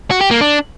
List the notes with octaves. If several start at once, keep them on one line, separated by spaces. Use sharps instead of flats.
F#4
G4
A#3
D4